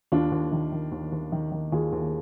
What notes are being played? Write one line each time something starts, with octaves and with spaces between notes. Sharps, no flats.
D#2 D4 F4
D#2
D#3
D#3
D#2
D#2
D#3
D#3
D#2 F4 G#4
D#2